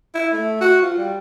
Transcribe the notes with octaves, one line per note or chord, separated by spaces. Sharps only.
E4
A3
F#4
F4
G3